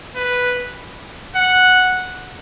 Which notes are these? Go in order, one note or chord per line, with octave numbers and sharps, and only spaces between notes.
B4
F#5